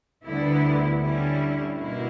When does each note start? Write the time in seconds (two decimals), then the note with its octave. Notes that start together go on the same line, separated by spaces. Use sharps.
0.24 D2 D3 G3 B3 E4
1.00 D3 G3 C#4 E4
1.77 B2 A#3 E4